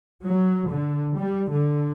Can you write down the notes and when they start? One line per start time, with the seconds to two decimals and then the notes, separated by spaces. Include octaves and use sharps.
0.23 F#3
0.68 D3
1.15 G3
1.49 D3